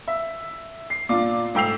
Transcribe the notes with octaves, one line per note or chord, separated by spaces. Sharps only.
E5
C7
A#2 D4 F4 D6
G#2 A3 G5 E6 C7 F7